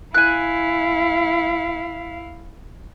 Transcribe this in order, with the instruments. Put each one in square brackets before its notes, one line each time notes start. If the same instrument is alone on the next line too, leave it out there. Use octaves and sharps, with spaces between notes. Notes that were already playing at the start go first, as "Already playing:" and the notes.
[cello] E4 F5 [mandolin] G#5 F#6